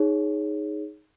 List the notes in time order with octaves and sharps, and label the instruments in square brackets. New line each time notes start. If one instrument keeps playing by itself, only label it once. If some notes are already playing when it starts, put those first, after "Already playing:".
Already playing: [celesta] D#4 G#4 C#5